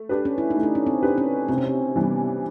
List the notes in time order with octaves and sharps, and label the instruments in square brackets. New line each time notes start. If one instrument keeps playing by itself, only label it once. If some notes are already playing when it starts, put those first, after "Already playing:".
Already playing: [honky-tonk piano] A3
D4 G4 B4
[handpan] C#4
E4
D#4
[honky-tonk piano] A3
[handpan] D4
C#4
C4
[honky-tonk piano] D4 G4 B4
[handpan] C#4
[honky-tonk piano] C3 [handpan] C4
[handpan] C#4
C4
[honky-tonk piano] E3 G3 B3 D4